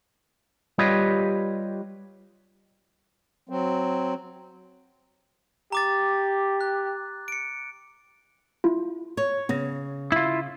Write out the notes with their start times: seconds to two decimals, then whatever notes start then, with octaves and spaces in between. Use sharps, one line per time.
0.78 G3 F4 G4 B4 C#5 D#5
3.49 F#3 C4
5.72 G4 A#5 D6 A6
6.61 F#6
7.28 C#7 D7
8.64 E4 F4
9.17 C#5
9.49 C#3 B3 A#6
10.12 E4 F4